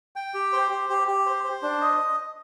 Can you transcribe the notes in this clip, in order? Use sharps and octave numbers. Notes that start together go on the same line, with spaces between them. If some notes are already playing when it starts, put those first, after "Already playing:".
G5
G4
C5
G4
G4
G4
C5
C5
D4
D#5